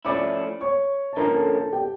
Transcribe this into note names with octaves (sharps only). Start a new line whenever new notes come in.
F3 A3 C#4 E4 D5 D6
C#5 C#6
A5
D3 F3 A#3 C#4 A#4 A#5
A4 A5
A4 A5
G4 G5